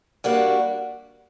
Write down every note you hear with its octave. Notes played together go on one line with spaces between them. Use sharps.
G3 A#3 D4 F#4